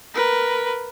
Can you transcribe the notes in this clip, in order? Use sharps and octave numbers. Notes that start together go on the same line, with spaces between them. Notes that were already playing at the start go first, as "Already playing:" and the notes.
A#4 B4